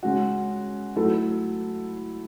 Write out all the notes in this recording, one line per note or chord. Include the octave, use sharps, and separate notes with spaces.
C#3 G#3 C#4 F#4
F#3 A3 E4 A4